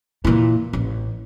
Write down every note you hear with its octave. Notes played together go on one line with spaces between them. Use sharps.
A#2 E3
A1